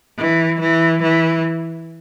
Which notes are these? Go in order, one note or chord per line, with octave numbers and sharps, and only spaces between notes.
E3
E3
E3